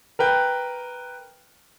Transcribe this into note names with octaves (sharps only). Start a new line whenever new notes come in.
A#4 B4 G5